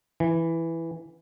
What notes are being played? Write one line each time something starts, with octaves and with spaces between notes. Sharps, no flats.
E3